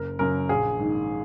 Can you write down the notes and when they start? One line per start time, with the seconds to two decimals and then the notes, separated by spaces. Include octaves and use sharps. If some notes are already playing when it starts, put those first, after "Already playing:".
Already playing: F#1 A#4
0.19 F#2 C#3 A#4
0.49 A#1 G#4
0.79 G#2 D#3